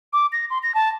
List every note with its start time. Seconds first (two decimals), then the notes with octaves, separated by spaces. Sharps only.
0.13 D6
0.32 A#6
0.50 C6
0.63 A#6
0.75 A5